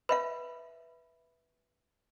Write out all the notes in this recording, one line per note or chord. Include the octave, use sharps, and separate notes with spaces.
B4 E5 F5 B5